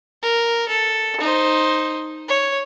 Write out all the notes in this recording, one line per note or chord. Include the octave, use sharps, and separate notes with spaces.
A#4
A4
D#4 C5
C#5